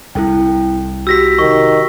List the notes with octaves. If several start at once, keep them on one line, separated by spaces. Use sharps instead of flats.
C2 E4 A4 G5
F#4 G4 E6 A#6 B6
D#3 C#6